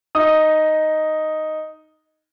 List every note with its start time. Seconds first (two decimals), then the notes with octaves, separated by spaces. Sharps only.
0.15 D#4 D#6